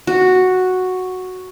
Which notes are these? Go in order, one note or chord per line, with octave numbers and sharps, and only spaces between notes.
F#4